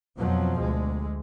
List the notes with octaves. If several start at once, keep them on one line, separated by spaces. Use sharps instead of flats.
F2 B2 F3 F#3
D2 G#3